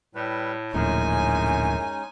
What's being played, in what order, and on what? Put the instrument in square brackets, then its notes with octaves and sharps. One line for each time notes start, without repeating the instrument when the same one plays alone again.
[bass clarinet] A2 [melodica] G3 B4
[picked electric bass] D1 A#1 A2 [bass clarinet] F#2 [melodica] G#3 C#4 D#4 [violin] G#5